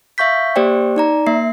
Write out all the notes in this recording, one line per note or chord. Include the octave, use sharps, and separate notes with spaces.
E5 F5 C#6 G6 B6
A#3 G4 C5 D5 G5
D#4 D5 A#5
A#3 E5 C7